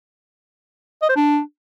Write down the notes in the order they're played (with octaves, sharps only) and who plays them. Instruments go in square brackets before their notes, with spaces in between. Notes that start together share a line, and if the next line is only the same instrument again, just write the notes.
[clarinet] D#5
C5
D4